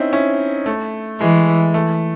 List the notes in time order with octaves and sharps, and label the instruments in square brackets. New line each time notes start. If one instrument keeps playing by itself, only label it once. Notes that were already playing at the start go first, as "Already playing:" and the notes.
Already playing: [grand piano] C4 C#4 D#4 E4
C#4 E4
A3
[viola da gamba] E3 [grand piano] G#3
[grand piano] A3